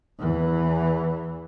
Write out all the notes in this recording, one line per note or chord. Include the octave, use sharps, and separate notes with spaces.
E2 E3